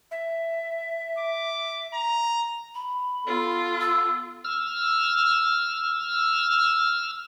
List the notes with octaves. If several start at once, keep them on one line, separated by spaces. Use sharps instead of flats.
E5
D6
A#5
B5
B3 F4 A4
E6
E6 F6